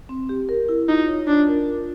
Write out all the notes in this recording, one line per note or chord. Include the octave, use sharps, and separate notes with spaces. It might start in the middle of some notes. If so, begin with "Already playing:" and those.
C4
G4
A#4
E4
D#4 F4
C#5
D4 F4
A#4
F4